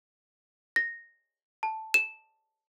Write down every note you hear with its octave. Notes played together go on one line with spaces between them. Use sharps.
A#6
A5
E7